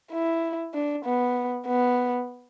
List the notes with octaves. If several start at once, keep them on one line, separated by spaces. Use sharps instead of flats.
E4
D4
B3
B3